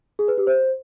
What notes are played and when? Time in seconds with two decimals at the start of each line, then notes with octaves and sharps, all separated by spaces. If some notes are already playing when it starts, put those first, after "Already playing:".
0.19 G#4
0.28 B4
0.38 G4
0.47 C5